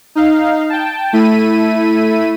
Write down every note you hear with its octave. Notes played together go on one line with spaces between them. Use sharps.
D#4 F5
G5 A5
A3 E4 B6 D#7